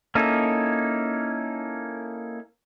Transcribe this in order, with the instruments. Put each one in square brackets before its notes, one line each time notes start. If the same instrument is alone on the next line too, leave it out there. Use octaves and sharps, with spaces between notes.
[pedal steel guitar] A#3 C#4 D#4 E4 A4